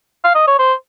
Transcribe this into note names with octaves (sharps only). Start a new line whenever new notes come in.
F5
D#5
C#5
C5